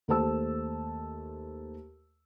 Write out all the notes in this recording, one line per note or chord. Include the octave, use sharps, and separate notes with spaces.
D#2 A3 C5 A5 E6